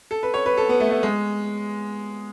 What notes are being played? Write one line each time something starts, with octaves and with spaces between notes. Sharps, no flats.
A4
B4
C#5
B4
A4
B3
A3
A3
G#3